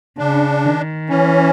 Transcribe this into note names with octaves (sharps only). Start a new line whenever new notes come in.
C#3 D4
D#3
E3 C#4